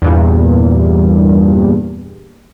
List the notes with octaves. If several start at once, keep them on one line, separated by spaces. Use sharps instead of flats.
E2 G2 A#2